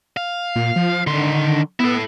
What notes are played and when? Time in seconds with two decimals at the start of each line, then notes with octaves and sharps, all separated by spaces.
0.17 F5
0.56 A#2
0.76 F3
1.07 D3 D#3 C6
1.80 B3 E4 A4